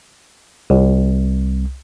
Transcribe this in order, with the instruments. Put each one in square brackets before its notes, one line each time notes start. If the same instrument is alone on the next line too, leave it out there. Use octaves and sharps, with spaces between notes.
[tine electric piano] C2